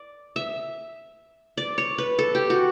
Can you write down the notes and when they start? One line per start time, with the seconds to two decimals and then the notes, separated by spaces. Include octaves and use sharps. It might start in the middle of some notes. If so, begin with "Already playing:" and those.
Already playing: D5
0.36 E5
1.57 D5
1.78 C#5
1.98 B4
2.19 A4
2.35 G4
2.50 F#4